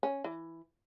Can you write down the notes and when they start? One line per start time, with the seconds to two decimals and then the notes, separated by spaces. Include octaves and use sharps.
0.03 C#4
0.24 E3